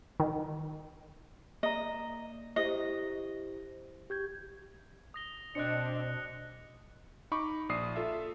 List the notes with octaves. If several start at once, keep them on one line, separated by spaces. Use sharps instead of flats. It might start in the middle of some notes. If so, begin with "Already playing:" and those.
D#3
A#3 D5 D#5 A#5
E4 G4 C5 D#5
G4 G6 G#6
D#6 A#6 G7
B2 C4 D4 D#5 F#6 C#7
D#4 B5 C#6 D6
A#1 D5 D#6 C7
F4 A4 E5